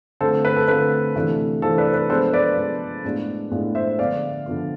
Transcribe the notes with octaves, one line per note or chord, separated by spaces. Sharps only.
D3 A3 C4 F4 A4 C5
B4
A4
D3 A3 C4 F4 B4
C3 E3 A3 D4 F4
C3 E3 A3 D4 F4 A4 C5
B4 D5
B4
F3 G#3 B3 D4 A4 C5
B4 D5
F3 G#3 B3 D4
A2 G#3 B3 D4 F4
A2 G#3 B3 D4 F4
C5 E5
D3 F3 B3 F4 D5 F5
D3 F3 B3 F4